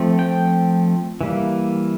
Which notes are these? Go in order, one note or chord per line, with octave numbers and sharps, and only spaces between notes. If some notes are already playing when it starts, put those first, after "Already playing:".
Already playing: F3 A3 C4
G5
E3 G3 A#3